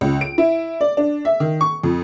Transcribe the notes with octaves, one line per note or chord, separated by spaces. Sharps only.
C#2
D7
E4
D5
D4
E5
D#3
C#6
F2